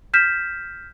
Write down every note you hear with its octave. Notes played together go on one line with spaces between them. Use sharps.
F6 G6 B6 E7